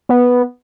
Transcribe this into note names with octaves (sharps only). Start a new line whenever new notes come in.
B3